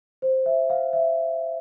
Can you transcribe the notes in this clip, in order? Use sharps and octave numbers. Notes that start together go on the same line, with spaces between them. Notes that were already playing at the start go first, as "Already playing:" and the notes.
C5
E5
F5
E5